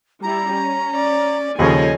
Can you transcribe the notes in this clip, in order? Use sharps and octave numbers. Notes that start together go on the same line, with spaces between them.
G3 E4 A#5
C#4
D5
D#2 C#3 F3 A4 C#5 D#5 G#5